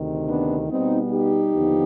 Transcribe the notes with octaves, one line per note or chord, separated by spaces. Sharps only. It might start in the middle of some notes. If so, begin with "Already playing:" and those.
Already playing: D2 C3 D#3
B3 D4
B2 G3 B3 C4 D#4
D#4 G4
D#2 D3 F3 B3